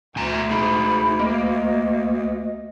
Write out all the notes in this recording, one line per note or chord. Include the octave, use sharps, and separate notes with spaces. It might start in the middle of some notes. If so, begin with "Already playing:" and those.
D2 B2 G#5 A#5
A3 D#4 G#4 B5
A#3 D#5